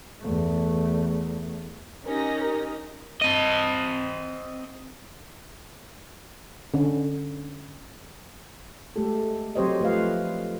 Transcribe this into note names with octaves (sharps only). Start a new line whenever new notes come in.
E2 A3
C#4 D#4 G4 A#4 A#6
A#4
C4 D#5
D3 C#4
G#3 A3 G4 A4
F#3 C4 G4 C5 C#5 D#5
F3 A3 B4 D#5 F5